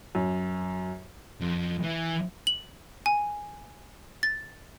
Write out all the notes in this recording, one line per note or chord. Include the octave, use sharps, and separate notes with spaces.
F#2
F2
E3
F#7
G#5
A6